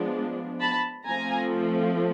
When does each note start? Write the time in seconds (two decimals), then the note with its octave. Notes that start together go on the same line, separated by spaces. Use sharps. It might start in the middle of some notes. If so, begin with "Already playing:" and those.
Already playing: F3 G#3 B3 D4
0.60 A5 B5
1.06 F3 A3 C4 G#5 A#5